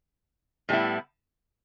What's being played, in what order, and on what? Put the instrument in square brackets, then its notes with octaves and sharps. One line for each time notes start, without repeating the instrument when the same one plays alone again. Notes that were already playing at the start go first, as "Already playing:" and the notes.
[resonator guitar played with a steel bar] A2 G3 B3 E4